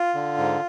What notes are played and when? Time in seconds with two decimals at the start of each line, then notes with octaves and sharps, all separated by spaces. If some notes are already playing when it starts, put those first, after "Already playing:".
Already playing: F4
0.15 D3
0.38 G#2